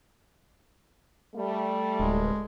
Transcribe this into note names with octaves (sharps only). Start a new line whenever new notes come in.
G3 A3
D1 G#3